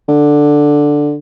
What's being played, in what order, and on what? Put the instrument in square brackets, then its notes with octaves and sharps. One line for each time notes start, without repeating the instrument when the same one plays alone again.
[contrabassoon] D3